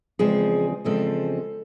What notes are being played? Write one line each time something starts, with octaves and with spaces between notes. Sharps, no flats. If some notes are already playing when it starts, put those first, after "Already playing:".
E2 C#3 F3 G#3 C4 G#4
E2 C#3 F3 G#3 C4 A4